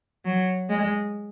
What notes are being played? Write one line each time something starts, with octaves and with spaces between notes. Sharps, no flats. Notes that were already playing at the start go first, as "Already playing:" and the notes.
F#3
G#3